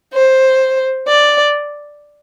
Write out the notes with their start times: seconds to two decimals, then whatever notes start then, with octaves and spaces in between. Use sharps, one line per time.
0.14 C5
1.08 D5